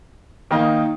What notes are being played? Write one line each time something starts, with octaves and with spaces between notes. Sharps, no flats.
D#3 A#3 D#4